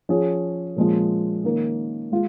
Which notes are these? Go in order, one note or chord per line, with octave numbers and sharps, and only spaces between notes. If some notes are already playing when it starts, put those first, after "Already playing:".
F3 C#4 F4 G#4
A#2 F3 G#3 C#4
D#3 A#3 C#4 A#4
G#3 F4